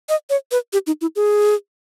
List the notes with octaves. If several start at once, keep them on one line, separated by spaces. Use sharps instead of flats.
D#5
C#5
B4
G4
D#4
E4
G#4